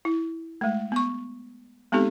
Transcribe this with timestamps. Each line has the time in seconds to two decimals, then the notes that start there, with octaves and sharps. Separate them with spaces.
0.05 E4
0.61 G#3 A3
0.92 B3 C#6
1.92 G#3 B3 C4 D#4 G4 A4